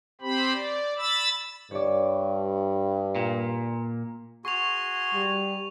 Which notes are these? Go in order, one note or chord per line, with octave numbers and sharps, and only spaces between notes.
C4 G4 C5 B5
D5
B5 E6 A6
G2 C#5 D5
A#2
F#4 G#4 C6 C#6 F7
G3